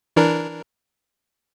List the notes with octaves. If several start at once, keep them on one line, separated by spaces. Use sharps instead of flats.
E3 D4 A#4